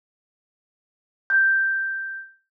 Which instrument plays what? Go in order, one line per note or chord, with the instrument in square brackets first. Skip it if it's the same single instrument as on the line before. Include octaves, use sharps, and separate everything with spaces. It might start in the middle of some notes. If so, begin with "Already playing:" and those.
[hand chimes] G6